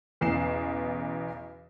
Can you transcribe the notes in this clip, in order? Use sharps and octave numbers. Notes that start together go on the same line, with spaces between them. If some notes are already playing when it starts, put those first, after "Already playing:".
B1 E2 C#3 C7 E7